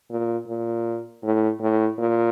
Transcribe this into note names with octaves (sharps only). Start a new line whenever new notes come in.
A#2
A#2
A2
A2
A#2